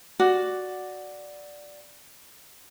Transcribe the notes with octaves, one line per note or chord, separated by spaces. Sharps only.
F#4 D5